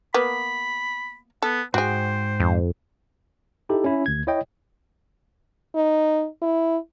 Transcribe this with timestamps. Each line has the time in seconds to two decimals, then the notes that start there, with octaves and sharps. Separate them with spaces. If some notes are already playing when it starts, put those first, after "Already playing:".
0.14 A#3 B3 B5
1.42 B3 A4
1.74 G#2 F#4 G#4 C5 G5
2.40 F2
3.69 D#4 E4 G4 A4
3.84 C#4 E4
4.06 D2 G#6
4.27 E4 C#5 D#5 G5
5.75 D#4
6.42 E4